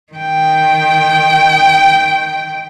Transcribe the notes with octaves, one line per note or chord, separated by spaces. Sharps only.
D#3 G5